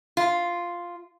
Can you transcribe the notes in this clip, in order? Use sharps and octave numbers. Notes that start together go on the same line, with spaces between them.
F4